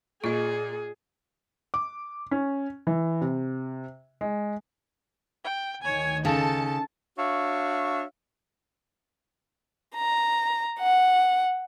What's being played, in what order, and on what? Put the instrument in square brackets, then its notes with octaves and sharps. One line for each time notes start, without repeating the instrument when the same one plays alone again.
[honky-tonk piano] A#2 [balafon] F4 D#5 [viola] G#4
[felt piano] D6
C#4
E3
C3
G#3
[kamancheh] G5
[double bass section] D2 D#3 [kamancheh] C#5 G#5
[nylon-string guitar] C#3 [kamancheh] D#4 A4 [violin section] A5
[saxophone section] D4 F#4 C#5 E5 F5
[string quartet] A#5
F#5